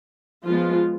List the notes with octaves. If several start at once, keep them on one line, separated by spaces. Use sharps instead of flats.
F3 G#3 B3 F4